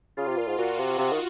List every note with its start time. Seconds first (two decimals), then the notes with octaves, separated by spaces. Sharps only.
0.17 C#3 F4
0.27 C3
0.37 A#2
0.47 G#2
0.58 A#2 F#4
0.78 C3
0.98 C3
1.12 D#3